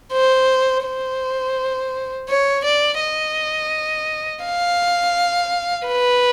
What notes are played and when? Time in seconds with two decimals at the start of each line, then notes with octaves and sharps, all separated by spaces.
0.13 C5
0.85 C5
2.29 C#5
2.64 D5
3.00 D#5
4.45 F5
5.88 B4